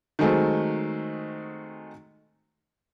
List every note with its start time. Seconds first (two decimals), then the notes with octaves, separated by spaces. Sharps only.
0.19 D#3 F#3 G#3 A3 C4